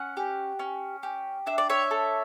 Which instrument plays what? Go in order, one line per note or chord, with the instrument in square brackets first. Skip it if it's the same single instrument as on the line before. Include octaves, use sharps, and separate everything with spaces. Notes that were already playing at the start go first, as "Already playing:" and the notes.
Already playing: [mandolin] C#4 F#5
G4
C#4
G4
D4 E5
D5
C#5 E5
A4